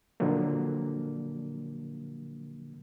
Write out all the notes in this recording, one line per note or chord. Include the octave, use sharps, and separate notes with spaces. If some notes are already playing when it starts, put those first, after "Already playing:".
A#2 D3 F3 F#3 A#3